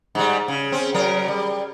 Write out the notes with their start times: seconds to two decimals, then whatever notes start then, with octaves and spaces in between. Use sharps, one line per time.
0.15 G#2 G3
0.48 C#3
0.72 C4 C#4
0.94 C#3 F#3 A#4
1.28 G3